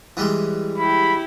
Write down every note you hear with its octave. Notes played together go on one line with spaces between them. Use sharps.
E3 G3 G#3
E4 G4 B5